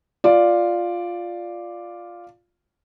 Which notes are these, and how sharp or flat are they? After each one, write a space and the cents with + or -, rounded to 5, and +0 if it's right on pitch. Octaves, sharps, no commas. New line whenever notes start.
F4 +0 D5 +0